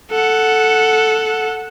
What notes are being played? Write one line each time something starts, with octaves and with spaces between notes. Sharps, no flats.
A4 F#5